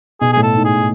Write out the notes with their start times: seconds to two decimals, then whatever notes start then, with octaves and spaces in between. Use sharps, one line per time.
0.21 B2 G#4
0.33 A2 G#4
0.43 A4
0.55 G#2
0.65 G#4